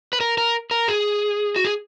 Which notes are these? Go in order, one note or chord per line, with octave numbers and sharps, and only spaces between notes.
B4
A#4
A#4
A#4
G#4
F#4
G#4